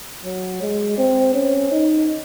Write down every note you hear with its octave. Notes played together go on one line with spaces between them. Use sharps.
F#3
G#3
C4
C#4
D#4